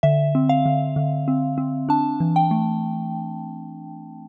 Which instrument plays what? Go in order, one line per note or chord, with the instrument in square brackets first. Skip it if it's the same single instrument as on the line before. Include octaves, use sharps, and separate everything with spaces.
[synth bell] D3 E5
C4
F5
D3
D3
C4
C4
D4 A5
E3
G5
A3